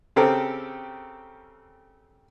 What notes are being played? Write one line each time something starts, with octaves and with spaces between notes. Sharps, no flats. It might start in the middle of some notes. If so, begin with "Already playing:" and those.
C#3 C4 G4 A4 A#4